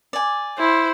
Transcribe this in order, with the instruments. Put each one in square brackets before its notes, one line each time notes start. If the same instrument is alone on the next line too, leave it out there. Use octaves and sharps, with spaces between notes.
[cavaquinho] D5 G#5
[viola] E4 [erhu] C5